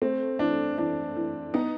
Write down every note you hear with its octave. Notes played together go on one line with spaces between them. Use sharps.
A3 C4
E3 D4
E3 D4
E3
B3 D#4